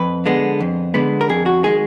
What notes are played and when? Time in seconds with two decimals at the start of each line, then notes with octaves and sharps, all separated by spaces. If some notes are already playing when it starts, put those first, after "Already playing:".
Already playing: F2 B4
0.26 D3 G#3 B3
0.60 F2
0.94 D3 G#3 B3
1.21 A#4
1.29 F2 G#4
1.46 F#4
1.63 D#3 G#3 G#4